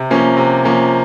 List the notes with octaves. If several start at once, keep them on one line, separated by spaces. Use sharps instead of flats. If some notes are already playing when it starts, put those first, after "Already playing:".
Already playing: C3
F3 A#3 C#4
C3
F3 A#3 C#4